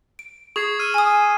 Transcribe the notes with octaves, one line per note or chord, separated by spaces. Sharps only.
D7
G#4 C#6 G#6 C7
E6 F6 D#7
G#5 D#6